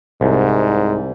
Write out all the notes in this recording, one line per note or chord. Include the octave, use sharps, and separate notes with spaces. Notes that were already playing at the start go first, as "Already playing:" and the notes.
C2 G#2